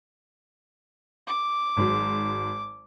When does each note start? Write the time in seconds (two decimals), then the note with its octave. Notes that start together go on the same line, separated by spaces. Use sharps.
1.27 D6
1.77 G#1 G#2 F#3